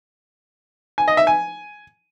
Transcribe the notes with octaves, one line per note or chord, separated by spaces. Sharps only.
G#5
D#5
E5
G#5